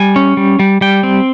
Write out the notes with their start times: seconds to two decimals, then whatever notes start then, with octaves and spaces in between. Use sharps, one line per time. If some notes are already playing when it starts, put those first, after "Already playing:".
Already playing: G3 G#5
0.16 C#4
0.37 G3
0.59 G3
0.81 G3 G5
1.03 C4